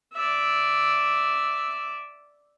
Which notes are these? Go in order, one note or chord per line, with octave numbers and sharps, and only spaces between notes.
D5 E5